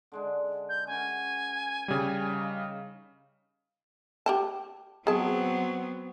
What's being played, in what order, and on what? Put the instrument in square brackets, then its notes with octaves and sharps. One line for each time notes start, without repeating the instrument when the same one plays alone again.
[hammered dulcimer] D3 G#3 D4
[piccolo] G6
[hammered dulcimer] C#4 F#4 A#4 [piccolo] G#5
[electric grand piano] C#3 G3
[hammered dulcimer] C#4 D#4 F5
[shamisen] G4 G5 A5
[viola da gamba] F#3 B3 C4 [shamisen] G#4 A5